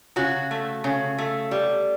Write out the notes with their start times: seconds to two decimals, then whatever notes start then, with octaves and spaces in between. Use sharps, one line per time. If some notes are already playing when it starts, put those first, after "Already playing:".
0.16 C#3 F#4
0.51 A3
0.84 C#3
1.18 A3
1.51 G3